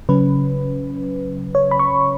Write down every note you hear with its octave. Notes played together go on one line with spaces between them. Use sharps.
C#3 F#3 C#4 B4
C#5
B5
C#6